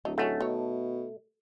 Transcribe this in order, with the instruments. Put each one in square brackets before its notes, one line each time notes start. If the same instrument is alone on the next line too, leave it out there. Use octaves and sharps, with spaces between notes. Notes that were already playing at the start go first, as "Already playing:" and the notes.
[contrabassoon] D1 [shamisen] F#3 A3 D#4
[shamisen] D#3 F#3 C#4 [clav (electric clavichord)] A3
[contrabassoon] B2 [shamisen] D#3 C#5